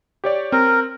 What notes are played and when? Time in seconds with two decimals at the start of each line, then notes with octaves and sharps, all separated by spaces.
0.24 G4 C#5 D5
0.52 C4 A#4